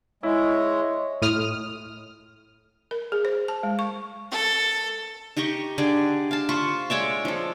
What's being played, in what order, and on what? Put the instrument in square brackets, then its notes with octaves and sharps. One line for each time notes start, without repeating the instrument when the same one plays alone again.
[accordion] G#3 [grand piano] E4 [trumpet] C#5
[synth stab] A2 D#6 F6
[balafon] A#4
G#4
C5
A5
G#3
C#6
[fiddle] A4
[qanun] D#4 G4 D#5 C#6
D3 G4 G#4 D5
F5 A5
F4 C5 B5 C#6
G#3 C#5 D5 E5
F3 A4